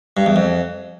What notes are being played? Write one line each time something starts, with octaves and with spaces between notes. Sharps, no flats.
G2
E2
F2